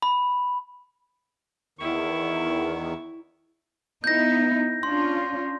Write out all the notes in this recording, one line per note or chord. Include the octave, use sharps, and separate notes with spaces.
B5
E2 D#3 E4 C#6
B3 D#4 E4 G6 A#6
C#4 D4 F4 C6